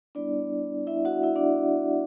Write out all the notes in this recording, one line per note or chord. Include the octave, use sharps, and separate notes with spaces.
G3 B3 D4 E4 D5
E4 E5
F#4 F#5
E4 E5
D4 D5